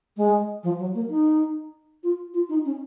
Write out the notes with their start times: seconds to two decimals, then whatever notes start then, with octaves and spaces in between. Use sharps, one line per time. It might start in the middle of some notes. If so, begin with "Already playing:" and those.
0.17 G#3
0.64 F3
0.78 F#3
0.94 A#3
1.09 D#4
2.03 F4
2.34 F4
2.49 D#4
2.65 C#4